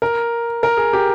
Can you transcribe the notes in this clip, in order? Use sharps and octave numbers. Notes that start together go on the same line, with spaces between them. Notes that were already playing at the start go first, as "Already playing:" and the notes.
A#4
A#4
G#4
G4